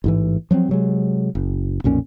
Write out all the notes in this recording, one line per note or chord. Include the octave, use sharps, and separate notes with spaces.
A1 G#2 E3
F3 F#3 A#3 C4
C3 F#3 G#3
F#1
B1 F2 A#2 C#4